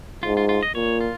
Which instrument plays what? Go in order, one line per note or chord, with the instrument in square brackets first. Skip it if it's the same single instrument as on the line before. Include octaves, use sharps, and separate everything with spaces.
[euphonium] G#2 [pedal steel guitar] F4
[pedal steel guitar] F4
F4
D#5
[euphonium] A#2 [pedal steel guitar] C#5
[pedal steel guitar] F4